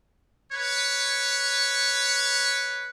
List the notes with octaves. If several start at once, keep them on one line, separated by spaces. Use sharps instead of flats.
B4 C#5